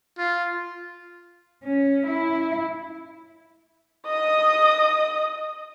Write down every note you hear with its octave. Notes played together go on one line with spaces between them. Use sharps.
F4
C#4
E4
D#5 D#6